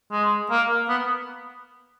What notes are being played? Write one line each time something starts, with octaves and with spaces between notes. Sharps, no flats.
G#3
A#3
B3